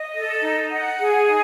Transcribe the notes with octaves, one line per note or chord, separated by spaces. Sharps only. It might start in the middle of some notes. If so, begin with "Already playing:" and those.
Already playing: D#5
A4
D#4
F#5
G#4
D#4